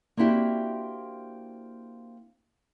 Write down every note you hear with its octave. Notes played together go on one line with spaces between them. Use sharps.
A#3 C4 D4 E4 F#4 G4